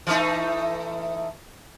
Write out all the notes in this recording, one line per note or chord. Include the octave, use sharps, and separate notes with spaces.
E3 A3 D#4